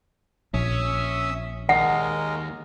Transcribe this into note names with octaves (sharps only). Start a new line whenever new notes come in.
A#1 C#4 E5 D#6 E6
D#2 G#3 A#4 D#5 F#5